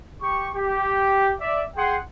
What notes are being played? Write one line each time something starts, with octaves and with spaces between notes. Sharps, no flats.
G4 C#6
G4
D5 E5
G#4 F#5 G5 C6